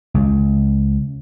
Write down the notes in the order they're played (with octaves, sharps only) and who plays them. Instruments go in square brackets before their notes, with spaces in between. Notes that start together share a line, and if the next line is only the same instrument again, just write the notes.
[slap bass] C#2